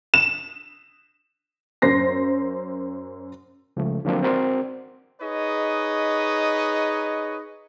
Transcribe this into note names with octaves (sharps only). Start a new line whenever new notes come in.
E7
F#2 C5 A#6 C7
C#2 F3 A3
D3 F3 F#3 A#3 C4 D4
C4 F#4 A#4 C5 D5
D#4 G#4 B4 C#5 D#5